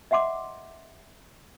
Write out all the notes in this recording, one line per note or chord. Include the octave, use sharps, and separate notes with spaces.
D#5 E5 F#5 C6 D6